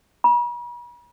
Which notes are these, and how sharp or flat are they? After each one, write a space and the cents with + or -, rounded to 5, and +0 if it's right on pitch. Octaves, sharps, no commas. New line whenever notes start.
B5 -45